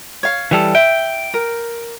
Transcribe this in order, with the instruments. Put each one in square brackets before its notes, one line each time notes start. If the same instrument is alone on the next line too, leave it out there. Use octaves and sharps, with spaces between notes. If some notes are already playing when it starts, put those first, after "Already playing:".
[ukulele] C#5 F5
[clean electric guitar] E3 G3 A4
[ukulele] E5 [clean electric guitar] G5
[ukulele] A#4